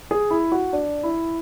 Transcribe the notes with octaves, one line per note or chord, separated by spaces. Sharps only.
G#4
E4
F#4
D4
E4